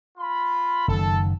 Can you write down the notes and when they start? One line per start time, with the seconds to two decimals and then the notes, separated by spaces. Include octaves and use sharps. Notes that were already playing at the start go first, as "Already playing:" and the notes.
0.18 F4 B5
0.88 F#1 F#2 D#3 A4